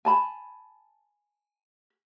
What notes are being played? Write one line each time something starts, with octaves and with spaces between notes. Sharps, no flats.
G#5 A5 B5